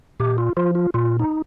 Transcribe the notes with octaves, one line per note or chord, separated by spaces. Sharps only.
A#2 G4
F4
F3 F4
F4
A#2 F4
D#4